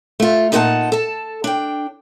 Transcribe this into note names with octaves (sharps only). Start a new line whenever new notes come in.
A3 F4
A#2 D#4 G#4 A4 F#5 A5
A4 A5
D4 G5